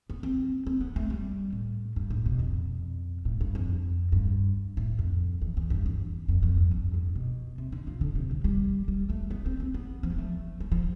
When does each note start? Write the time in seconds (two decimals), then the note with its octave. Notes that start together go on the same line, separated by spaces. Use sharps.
0.10 B3
0.23 C4
0.67 C4
0.81 B3
0.96 A3
1.10 G3
1.53 A2
1.96 G2
2.10 A2
2.26 B2
2.39 F2
3.25 A2
3.41 G2
3.55 F2
4.12 G2
4.77 A2
4.99 F2
5.42 E2
5.57 E2
5.70 G2
5.86 E2
6.28 F2
6.43 F2
6.57 G2
6.71 F2
6.94 G2
7.16 B2
7.58 C3
7.72 D3
7.87 F3
8.01 D3
8.15 C3
8.31 G3
8.44 G3
8.88 G3
9.10 A3
9.31 B3
9.46 C4
9.60 C4
9.74 B3
10.03 F3
10.10 G3
10.18 A3
10.60 G3
10.72 F3